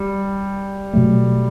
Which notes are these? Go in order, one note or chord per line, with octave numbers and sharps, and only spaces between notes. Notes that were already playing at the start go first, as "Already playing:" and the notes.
Already playing: G3
B2 F#3 A3